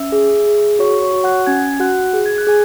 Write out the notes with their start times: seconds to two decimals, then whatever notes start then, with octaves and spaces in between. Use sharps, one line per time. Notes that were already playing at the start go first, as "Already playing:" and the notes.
Already playing: C#4 E5 E6
0.12 G#4
0.46 G#4
0.79 F#4 C#5 C#6
1.02 C#5 C#6
1.13 F#4
1.24 F#5 F#6
1.46 C#4 G#5 G#6
1.80 F#4 F#5 F#6
2.13 G#4
2.26 G#6
2.38 F#6
2.47 G#4 G#5 G#6